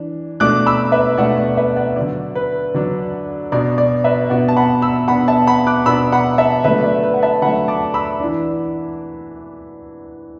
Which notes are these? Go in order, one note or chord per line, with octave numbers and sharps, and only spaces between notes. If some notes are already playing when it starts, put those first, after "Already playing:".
Already playing: E3 D4
B2 A3 D4 D6 F#6
B5 E6
B4 E5
B2 A3 D4 D5 F#5
D5
B4 E5
D5 F#5
D3 F#3 D4 D5
B4
D3 F#3 D4
B2 B3 D4 D5
D5
B4 E5
B2 B3 D4 D5 F#5
A5
F#5 B5
B5 E6
B2 B3 D4 F#5 B5
E5 A5
F#5 B5
D6 F#6
B2 B3 D4 B5 E6
F#5 B5
E5 A5
D3 F#3 A3 B4 E5
D5
B4
F#5
E5 A5
D3 F#3 A3 F#5 B5
A5 D6
B5 E6
E3 D4